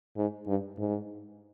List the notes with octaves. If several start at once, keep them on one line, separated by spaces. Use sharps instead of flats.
G#2
G2
G#2